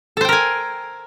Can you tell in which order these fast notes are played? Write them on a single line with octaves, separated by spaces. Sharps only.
A4 C5 G5 A#4 G#5